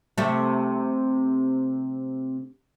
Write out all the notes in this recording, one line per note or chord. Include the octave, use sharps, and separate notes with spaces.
C3 A3